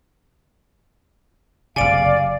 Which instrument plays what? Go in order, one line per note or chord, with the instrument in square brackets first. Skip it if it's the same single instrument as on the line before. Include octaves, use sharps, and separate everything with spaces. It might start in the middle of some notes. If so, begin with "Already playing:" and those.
[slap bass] F#1 C3 [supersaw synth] D5 [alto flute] F5 [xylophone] G#5 D7